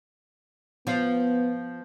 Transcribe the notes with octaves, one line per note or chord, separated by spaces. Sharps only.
F3 B3 F4